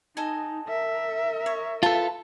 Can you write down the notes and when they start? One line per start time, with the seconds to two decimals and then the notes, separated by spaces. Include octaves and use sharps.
0.17 D#4 A4 D#5 G#5
0.69 A#4 E5
1.46 C#5
1.83 E4 F4 A4 B4 A5